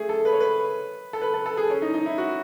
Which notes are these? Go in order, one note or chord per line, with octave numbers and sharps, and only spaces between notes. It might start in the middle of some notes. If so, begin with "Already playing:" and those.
Already playing: A3 G#4
A4
B4
C#5
B4
A4
B4
A4
A4
G#4
C#4
D#4
D#4
E4
F#4